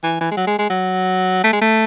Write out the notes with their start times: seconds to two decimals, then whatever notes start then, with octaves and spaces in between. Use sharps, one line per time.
0.03 E3
0.21 E3
0.31 G#3
0.37 F#3
0.47 G#3
0.59 G#3
0.70 F#3
1.44 A3
1.53 G#3
1.62 A3